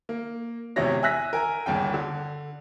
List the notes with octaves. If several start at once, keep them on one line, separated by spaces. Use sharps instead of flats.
A#3
G#1 E2 C3 E3 C#5 A#6
E5 G#5 E6 F#6 A#6 B6
A#4 G#5
G1 D#2 C#3 G5
D3